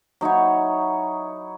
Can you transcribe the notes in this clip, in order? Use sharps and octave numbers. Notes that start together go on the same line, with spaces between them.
F#3 D#4 E4 C#5